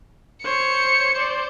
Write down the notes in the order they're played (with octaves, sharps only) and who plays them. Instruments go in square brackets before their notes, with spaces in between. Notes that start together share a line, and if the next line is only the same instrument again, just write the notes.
[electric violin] C5 C#5 [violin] C#7
[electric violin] C5 D5